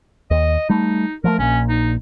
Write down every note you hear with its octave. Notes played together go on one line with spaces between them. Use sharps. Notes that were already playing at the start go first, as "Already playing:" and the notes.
D#2 D#5
G3 A3 D#4
F3 F#3 A3 A#4
A#1 A#2 C#4
D#4